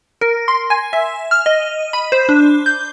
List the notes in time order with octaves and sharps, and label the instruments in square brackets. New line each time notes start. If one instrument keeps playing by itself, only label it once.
[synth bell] A#4
C6
G#5
E5
F6
D#5
B5
C5
D4
G6